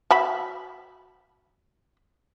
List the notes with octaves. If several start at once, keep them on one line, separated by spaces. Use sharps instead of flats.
F#4 E5 B5